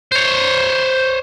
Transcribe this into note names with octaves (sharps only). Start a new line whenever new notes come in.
C5 C#5